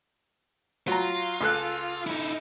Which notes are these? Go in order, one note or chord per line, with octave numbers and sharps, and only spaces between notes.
F#3 F4 A#5
C#2 A4 F#6
D#4 E4